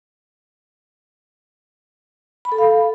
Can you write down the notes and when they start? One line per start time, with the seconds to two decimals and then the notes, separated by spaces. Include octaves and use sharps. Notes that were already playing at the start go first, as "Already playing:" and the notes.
2.45 B5
2.52 A4
2.58 F5